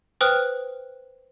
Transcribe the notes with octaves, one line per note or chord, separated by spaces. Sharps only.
B4 C5 G5 D#6 F6 F#6